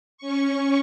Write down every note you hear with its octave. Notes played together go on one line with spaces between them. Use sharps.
C#4 C#6